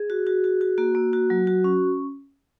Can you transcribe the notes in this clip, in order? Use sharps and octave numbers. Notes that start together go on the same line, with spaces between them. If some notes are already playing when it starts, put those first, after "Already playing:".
Already playing: G#4
F#4
F#4
F#4
F#4
A#3 F#4
A#3
F#4
F#3
F#4
C#4